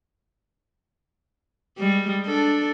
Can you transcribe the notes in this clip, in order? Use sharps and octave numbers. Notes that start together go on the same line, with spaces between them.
G3 G#3
D4 A4